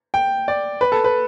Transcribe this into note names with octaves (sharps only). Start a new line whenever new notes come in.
G5
D5
B4
A4
B4